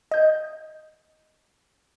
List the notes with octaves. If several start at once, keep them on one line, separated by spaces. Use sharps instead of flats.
D#5 G6